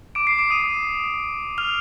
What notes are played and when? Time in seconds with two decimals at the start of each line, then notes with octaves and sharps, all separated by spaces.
0.15 D6 D7
0.27 C7
0.39 D6 D7
0.50 D#6 D#7
1.58 F6 F7